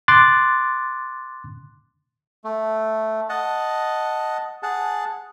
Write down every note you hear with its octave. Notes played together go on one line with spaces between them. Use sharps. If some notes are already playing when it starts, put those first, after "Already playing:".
C6 D6 F#6 A6
A3
D#5 F#5 A5
G#4 F#5 A5